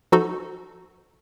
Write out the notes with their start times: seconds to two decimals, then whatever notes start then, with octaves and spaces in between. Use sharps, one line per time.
0.12 F3 D#4 F#4 A4